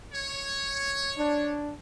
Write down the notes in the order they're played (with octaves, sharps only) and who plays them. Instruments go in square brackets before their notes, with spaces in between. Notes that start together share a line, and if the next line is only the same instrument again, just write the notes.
[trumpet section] C#5
[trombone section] D4